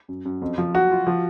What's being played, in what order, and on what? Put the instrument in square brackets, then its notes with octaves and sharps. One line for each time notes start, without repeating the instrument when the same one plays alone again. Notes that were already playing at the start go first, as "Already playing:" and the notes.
[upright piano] F#2
F#2
F2
F3
[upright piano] F#3 [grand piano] F#4
[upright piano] F4
F3